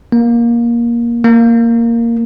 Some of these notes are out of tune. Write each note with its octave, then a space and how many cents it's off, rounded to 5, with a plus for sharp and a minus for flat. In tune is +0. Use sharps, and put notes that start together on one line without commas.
A#3 +15
A#3 -5